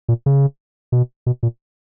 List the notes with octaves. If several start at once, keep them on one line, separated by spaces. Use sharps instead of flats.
A#2
C#3
B2
B2
A#2